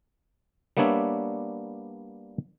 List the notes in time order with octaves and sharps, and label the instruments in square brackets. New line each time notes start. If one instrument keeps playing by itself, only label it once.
[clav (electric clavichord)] G3 A#3 B3 D4 C#5 E5